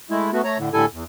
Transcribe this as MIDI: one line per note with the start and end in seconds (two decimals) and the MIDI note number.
0.10 0.31 56
0.10 0.31 57
0.10 0.31 64
0.33 0.42 57
0.33 0.42 59
0.33 0.42 66
0.44 0.58 57
0.44 0.58 73
0.44 0.58 82
0.59 0.70 45
0.59 0.70 50
0.73 0.85 45
0.73 0.85 50
0.73 0.85 55
0.73 0.85 64
0.73 0.85 69
0.73 0.85 80
0.93 1.04 40